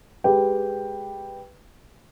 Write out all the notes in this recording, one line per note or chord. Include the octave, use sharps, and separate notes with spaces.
G#3 G4 B4 G5